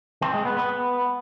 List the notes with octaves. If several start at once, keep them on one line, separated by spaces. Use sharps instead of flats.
C4
G#3
B3
B3